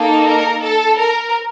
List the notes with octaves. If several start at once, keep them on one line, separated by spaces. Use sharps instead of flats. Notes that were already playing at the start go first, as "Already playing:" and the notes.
Already playing: A#3 D#4 A4
A#4
A4
A#4